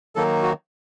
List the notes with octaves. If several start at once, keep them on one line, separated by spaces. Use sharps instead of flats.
D#3 F#3 A#3 D#4 A4
F#4